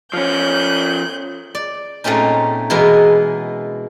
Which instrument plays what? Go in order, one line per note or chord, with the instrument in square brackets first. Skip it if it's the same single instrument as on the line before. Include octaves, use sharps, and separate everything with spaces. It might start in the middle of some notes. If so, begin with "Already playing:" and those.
[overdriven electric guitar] F3 C#4 [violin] F#6 G6
[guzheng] D5
A#2 A3 C4 C#4 D#4
B2 E3 G#3 B3 A#4